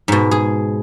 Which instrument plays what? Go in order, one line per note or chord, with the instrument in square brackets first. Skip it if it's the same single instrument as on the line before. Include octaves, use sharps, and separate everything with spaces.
[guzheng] G#2 B2
G#4